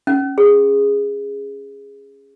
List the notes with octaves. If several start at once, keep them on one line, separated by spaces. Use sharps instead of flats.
C#4
G#4